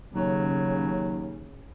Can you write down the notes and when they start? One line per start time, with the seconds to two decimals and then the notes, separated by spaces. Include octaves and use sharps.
0.15 D#2 C#3 F#3